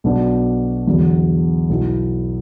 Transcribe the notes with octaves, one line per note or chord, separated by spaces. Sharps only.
B1 B2 B3 D4 F#4
E2 D3 F#3
B1 B2 B3 E4